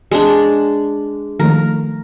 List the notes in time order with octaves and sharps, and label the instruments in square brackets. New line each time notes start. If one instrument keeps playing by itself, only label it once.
[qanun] G#3 D4
[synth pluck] D#3 F3 A3 [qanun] A#4